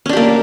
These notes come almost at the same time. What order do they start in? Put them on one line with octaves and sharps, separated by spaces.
C#4 D4 G4 A#3